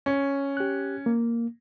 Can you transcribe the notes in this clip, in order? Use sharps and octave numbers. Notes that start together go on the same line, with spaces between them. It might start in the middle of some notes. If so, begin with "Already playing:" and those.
C#4
G4 F#6
A#3